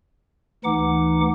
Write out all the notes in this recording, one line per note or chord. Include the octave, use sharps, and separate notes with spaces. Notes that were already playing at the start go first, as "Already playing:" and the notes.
D2 E3 D#4 F#5 D6